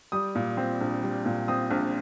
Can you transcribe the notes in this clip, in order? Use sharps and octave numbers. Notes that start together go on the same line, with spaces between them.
G3 D#6
A#2
C4
A#1
G3
A#2
C4 D#6
A#1